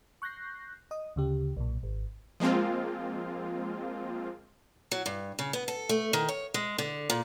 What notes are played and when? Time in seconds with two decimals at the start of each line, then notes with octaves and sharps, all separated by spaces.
0.22 C#6 F#6 G6 A#6 C7
0.91 D#5 D#6
1.16 D2 C#3 G4
1.57 B1 A#2
1.83 G#1
2.40 F3 G#3 A#3 C4 F4
4.92 F#3
5.06 G2
5.39 C#3
5.53 B3
5.68 A4
5.89 A3
6.13 D#3
6.29 C#5
6.54 G#3
6.78 D3
7.10 A#2